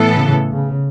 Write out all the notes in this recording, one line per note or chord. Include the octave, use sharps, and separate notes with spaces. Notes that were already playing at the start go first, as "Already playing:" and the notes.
Already playing: A2 E3 B3 A4
C#3
C#3